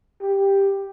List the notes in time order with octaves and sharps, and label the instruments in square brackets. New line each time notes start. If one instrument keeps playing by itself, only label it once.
[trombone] G4